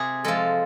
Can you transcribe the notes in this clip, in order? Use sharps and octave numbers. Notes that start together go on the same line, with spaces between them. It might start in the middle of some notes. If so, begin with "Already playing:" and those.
Already playing: C3 G#4
F3 G#3 A4